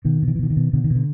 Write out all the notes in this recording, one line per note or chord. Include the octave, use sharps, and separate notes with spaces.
B2 D#3
B2
D#3
E3
B2 D#3
D#3
B2
B2 D3
D#3
B2
D3